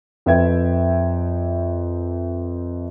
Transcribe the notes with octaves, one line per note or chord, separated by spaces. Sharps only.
F2 B4 E5 G5 G#6